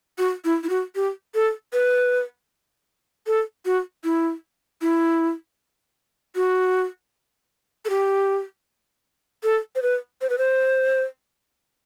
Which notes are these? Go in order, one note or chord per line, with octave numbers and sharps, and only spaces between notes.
F#4
E4
E4
F#4
G4
A4
B4
A4
F#4
E4
E4
F#4
A4
G4
A4
C5
B4
C5
B4
C5